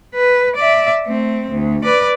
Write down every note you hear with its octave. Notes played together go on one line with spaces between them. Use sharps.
B4
D5 E5
A3 C4
D2
B4 D5